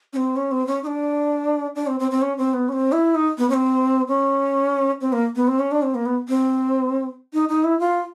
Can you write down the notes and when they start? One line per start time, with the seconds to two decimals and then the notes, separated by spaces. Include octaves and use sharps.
0.13 C#4
0.17 C4
0.36 C#4
0.51 C4
0.67 C#4
0.83 D#4
0.87 D4
1.76 D4
1.87 C4
2.00 C4
2.11 C4
2.22 C#4
2.38 C4
2.53 B3
2.69 C#4
2.73 C4
2.92 E4
3.15 D#4
3.38 B3
3.50 C#4
3.54 C4
4.08 C#4
5.01 C4
5.13 A#3
5.36 B3
5.48 C4
5.59 C#4
5.71 D4
5.83 C4
5.95 A#3
6.06 B3
6.29 C4
7.33 D#4
7.49 D#4
7.64 E4
7.79 F4